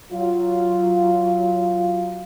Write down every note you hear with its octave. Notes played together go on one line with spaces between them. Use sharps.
F#3 F4